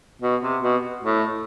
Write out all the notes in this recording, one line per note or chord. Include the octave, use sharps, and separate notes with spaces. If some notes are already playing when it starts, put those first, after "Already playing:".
B2
C3
B2
A2